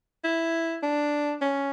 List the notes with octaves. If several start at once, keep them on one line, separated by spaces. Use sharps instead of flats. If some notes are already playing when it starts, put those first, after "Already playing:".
E4
D4
C#4